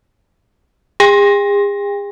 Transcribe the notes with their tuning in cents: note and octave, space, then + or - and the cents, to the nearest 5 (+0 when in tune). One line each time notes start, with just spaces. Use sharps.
G#4 -40 G5 +40